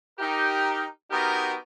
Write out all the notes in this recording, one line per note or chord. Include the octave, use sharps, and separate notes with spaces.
D#4 G4 A#4
B3 D#4 F#4 G4 A#4